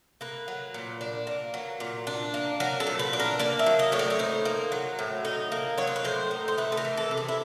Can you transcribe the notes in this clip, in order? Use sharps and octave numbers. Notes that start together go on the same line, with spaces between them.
A#3 B4
F#3
A#2
D4
A#3
F#3
A#2
D4
A#3
F#3 A#4
A4
A#2
B4
D4
A#4
A#3 D5
E5
F#3
D#5
A2 C#5
D5
C#5
D#4 C5
A#3
F#3
A2
D#4
A#3
F#3 C#5
C5
B4
A2 C5
D#4
C5
A3 B4
A4
A#4
E3
A4
C3
G#4
E4